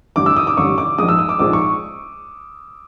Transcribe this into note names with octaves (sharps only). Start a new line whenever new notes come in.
A1 G2 D3 D6
E6
D#6
D6
A1 G2 D3 C#6
D6
A#1 G#2 F3 G#3 D#6
E6
D#6
D6
A#1 G#2 F3 G#3 D6
C#6